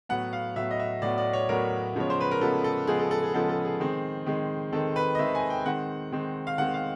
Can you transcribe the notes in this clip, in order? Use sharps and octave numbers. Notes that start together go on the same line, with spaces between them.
A2 F#3 B3 F#5
F5
A2 F#3 B3 E5
D#5
E5
A2 F#3 B3 D5
D5
C#5
A2 F#3 B3 A#4
C#3 F3 G#3 B3 C#5
C5
B4
A#4
C#3 F3 G#3 B3 A4
A4
C#3 F3 G#3 B3 G#4
A4
A4
G#4
C#3 F3 G#3 B3 A4
A4
G#4
D#3 G#3 C4
D#3 G#3 C4
D#3 G#3 C4 A4
B4
D#5
D#3 G#3 C4 E5
G#5
G5
D#3 G#3 C4 F#5
D#3 G#3 C4
F5
D#3 G#3 C4 F#5
F5